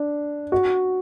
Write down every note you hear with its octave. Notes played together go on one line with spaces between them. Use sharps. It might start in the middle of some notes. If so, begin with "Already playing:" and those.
Already playing: D4
F#4